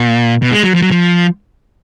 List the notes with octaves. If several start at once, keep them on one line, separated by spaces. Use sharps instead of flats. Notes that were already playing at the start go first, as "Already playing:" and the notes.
Already playing: A#2
B2
G#3
F#3
F3
F#3
F3